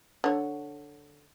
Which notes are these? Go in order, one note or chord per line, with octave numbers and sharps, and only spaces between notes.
D3 C#5